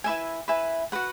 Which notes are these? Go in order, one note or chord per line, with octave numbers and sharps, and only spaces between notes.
E4 B4 E5 G#5
E4 B4 E5 G#5
F#4 B4 F#5